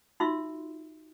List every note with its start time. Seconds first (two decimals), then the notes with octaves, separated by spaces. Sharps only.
0.20 D#4 F4 F#4 E5 C6 E6